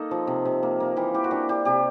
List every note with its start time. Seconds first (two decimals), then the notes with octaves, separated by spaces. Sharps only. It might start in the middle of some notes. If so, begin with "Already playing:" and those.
Already playing: A#3 D#4 A4
0.11 F3
0.27 C3
0.45 C3
0.63 A#3
0.80 A#3
0.96 E3 G4
1.14 E3 G4
1.24 F#4
1.31 D4 G4
1.49 D4 G4
1.65 C3 G4